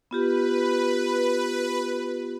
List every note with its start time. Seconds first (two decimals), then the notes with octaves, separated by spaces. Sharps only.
0.11 B3 F4 G4 B4